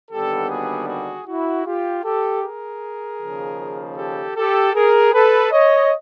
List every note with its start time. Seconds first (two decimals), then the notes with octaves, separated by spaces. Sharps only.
0.11 D#2 D3 G3 B3 G4 A4
0.49 F#4 G#4
0.88 F#4 G#4
1.27 E4 F#4
1.65 F4 G4
2.04 G4 A4
2.43 G#4 A#4
3.19 D#2 C#3 F3
3.97 G4 A4
4.36 G4 A4
4.74 G#4 A#4
5.13 A4 B4
5.52 C#5 D#5